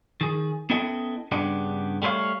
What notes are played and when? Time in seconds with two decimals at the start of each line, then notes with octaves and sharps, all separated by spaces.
0.21 D#3 G#4
0.70 B3 C#4 E4 A4 D#5 G5
1.32 G2 C#3 B3 D4 G4
2.02 G3 A3 B3 E4 C#5 F5